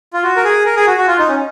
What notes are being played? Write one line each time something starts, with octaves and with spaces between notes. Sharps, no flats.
F4
F#4
A#4
G#4
A#4
G#4
F#4
F#4
F4
D#4
C#4